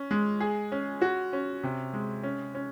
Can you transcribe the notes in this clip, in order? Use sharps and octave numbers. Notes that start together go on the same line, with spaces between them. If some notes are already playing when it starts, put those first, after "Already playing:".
Already playing: C#4
G#3
G#4
C#4
F#4
C#4
C3
G#3
C#4
C#4